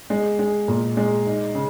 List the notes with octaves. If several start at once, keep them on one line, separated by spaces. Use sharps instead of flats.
G#3
G#3
A#2
G#3
D#4
C#3